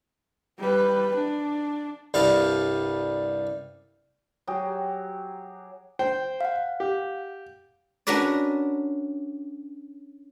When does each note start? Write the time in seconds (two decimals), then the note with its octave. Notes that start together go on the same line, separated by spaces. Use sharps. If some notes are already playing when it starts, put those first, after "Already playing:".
0.58 G3 B4
1.15 D4
2.14 C2 G2 G3 F5 A5
4.47 F#3 G4 G#4
5.99 C5 G5
6.41 F5 F#5
6.80 G4
8.07 C#4 D4 F#4 A#4 B4 D5